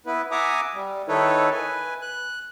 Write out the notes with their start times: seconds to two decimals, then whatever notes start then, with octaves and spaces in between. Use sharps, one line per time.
0.06 B3 E4 B4
0.31 E5 F#5 G#5 A#5 D6 D#6
0.74 G3
1.08 D#3 D#4 E4 A4 B4 C#5
1.51 B4 G#5
2.02 F#6